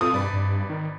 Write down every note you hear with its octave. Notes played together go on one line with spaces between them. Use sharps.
B2 C4 F4 A4 D#6
G#1 G2 B4 D5
G2
D#3